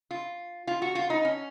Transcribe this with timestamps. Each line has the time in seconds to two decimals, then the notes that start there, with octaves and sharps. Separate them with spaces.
0.11 F4
0.67 F4
0.82 F#4
0.95 F4
1.10 D#4
1.25 C#4